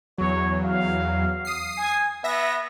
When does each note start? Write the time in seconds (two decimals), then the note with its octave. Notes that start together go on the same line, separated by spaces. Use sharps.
0.18 E2 F#3 C#5
0.64 F5
1.45 D#6 C7
1.78 G#5
2.24 B3 E5 A#6